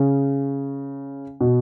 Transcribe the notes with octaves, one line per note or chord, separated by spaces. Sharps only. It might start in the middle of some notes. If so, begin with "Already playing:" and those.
Already playing: C#3
B2